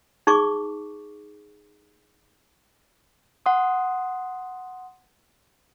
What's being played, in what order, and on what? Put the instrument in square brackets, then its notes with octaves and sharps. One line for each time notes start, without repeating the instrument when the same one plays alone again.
[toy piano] D#4 G#4 C#6 D6
[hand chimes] F#5 C6 D#6